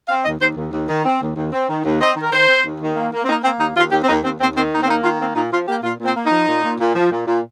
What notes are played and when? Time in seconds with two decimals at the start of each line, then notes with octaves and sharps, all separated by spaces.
0.09 C4 F5
0.25 D#2 D#5
0.40 D#2 C5
0.57 D#2
0.72 D#2
0.89 D#3
1.05 C4
1.21 D#2
1.36 D#2
1.53 C4
1.69 D#3
1.84 D#2
2.00 C4 D#5
2.16 D#3
2.23 A#4
2.32 D#3 C5
2.49 C4
2.64 D#2
2.81 D#3
2.96 A#3
3.13 A#3
3.24 C4
3.29 A#3 D#4
3.44 A#3 C4
3.60 D#2 D#4
3.76 D#2 F4
3.92 D#2 G4
4.04 C4
4.09 D#2 D#4
4.24 D#2 C4
4.41 D#2 C4
4.56 D#3 C4
4.73 D#2 D#4
4.83 C4
4.88 A#3 D#4
5.03 D#3 F4
5.20 A#3 C4
5.35 A#2 D#4
5.52 F3 F4
5.68 A#3 G4
5.83 A#2 F4
5.99 A#2
6.05 C4
6.16 A#3
6.26 D#4
6.31 F3
6.48 A#2
6.64 A#2
6.80 A#2
6.96 F3
7.12 A#2
7.27 A#2